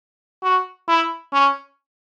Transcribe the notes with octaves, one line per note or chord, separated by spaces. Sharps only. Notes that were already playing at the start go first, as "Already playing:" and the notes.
F#4
E4
C#4